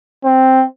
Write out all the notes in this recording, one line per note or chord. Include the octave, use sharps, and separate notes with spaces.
C4